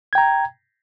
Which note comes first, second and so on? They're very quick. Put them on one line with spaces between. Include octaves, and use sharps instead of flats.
G#6 G5 A#5